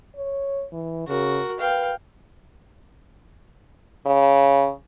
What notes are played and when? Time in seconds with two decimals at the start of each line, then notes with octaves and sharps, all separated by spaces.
0.16 C#5
0.72 E3
1.08 C#3 F#4 A#4
1.60 B4 F5 G5
4.06 C#3